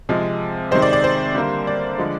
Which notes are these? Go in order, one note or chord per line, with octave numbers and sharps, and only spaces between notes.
C3 F3 G#3
C3 D#3 G#3 C5
D5
D5
C5
D3 G3 A#3
D5
D3 F3 G#3